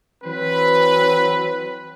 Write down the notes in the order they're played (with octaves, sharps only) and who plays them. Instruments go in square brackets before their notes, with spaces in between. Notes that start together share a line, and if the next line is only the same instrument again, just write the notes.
[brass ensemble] E3 F#3 C4 B4